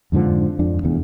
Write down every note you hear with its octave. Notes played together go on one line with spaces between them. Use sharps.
F2 G#2 D3 F3
F2 D4
F1 E2